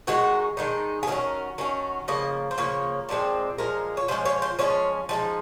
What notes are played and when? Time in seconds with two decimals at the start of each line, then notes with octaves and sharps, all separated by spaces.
0.07 D#3 G#3 D#4 F#4
0.57 D#3 G#3 D#4
1.03 G#4
1.07 D#3 F#3 C#4 A#4
1.58 D#3 F#3 C#4
2.08 C#3 F3 A#3 D#5
2.51 C5
2.58 C#3 F3 A#3 C#5
3.09 A#2 F3 G#3 C4
3.58 A#2 F3 G#3 A#4
3.97 C#5
4.08 F3 G#3 C#4 C5
4.25 C#5
4.42 C5
4.59 F3 G#3 C#4 C#5
5.09 F3 G#3 D#4